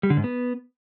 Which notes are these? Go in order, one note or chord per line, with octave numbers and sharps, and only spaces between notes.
G3
D3
G#2
B3